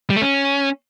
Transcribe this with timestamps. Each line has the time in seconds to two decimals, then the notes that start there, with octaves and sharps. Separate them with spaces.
0.10 G3
0.16 A3
0.22 C#4